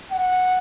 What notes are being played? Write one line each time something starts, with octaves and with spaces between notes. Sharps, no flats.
F#5